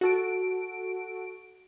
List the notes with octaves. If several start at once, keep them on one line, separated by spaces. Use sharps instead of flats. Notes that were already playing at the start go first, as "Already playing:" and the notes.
F#4 A4 D7